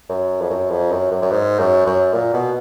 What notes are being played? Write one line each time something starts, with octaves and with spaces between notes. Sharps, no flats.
F#2
F2
F#2
F2
F#2
F#2
F#2
G#2
F#2
F#2
A#2
B2